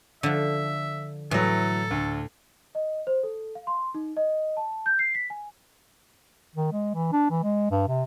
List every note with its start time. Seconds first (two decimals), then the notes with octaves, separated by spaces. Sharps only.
0.23 D3 F3 E5
1.31 A2 E3 F#3 A4
1.91 D2
2.75 D#5
3.07 C5
3.23 A4
3.55 F5
3.67 C6
3.94 D#4
4.17 D#5
4.57 A5
4.86 G6
4.99 C7
5.15 B6
5.30 G#5
6.55 D#3
6.72 G#3
6.94 E3
7.12 D4
7.30 E3
7.43 G#3
7.71 G2
7.88 C3